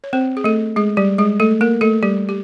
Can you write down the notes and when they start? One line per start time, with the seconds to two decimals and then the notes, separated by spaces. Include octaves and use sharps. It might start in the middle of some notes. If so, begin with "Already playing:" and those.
0.04 C#5
0.13 C4 C5
0.37 G#4
0.44 A3 A4
0.76 G#3 G#4
0.97 G3 G4
1.18 G#3 G#4
1.40 A3 A4
1.61 A#3 A#4
1.81 A3 A4
2.03 G3 G4
2.29 G4